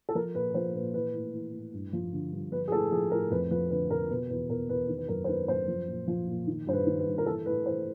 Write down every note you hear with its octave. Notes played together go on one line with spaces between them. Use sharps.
A4
F3 A#4
A#2 B4
F3 C5
A#2 B4
E3 B4
A2
E3
A2
G2
F3
D3
G2
F3 B4
G#4
A2 A4
F3 G#4
A2 A#4
F2 B4
F3 B4
D3 B4
F2 A#4
B2 B4
E2 B4
B2 A#4
E2 B4
D#3
B4
F#2 A#4
C5
D#3 B4
F#2 C5
F3
A#2
F3
A#2
D#3
G2 C5
B4
D#3
B4
G2
A#4
E3 A4
A2 B4
E3 C5